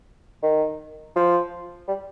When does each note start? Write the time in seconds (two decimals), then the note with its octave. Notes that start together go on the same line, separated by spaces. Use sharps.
0.43 D#3
1.16 F3
1.88 G3